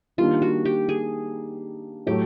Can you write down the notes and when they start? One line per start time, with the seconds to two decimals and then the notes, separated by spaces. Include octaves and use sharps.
0.18 D#3 G3 A#3 D4 F4
0.42 F#4
0.65 G4
0.89 G#4
2.07 A2 F#3 A3 G4